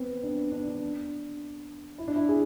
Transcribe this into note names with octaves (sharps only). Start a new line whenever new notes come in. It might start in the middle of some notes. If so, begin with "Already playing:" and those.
Already playing: B3 C4
D4
D4
D4
E4
D4
E4
G#4